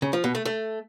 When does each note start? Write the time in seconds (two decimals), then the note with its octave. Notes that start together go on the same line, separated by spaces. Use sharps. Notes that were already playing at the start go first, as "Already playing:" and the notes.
0.02 C#3
0.13 F3
0.24 B2
0.35 A3
0.45 A3